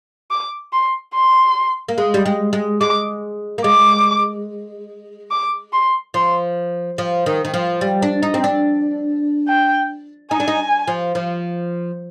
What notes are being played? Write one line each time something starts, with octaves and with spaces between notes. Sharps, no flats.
D6
C6
C6
A#3
G#3
G3
G#3
G#3
G#3 D6
A#3
G#3 D6
D6
C6
F3 C6
F3
D#3
D#3
F3
G3
D4
D#4
C4
D4
G5
D#4 G#5
D4
D#4
F3
F3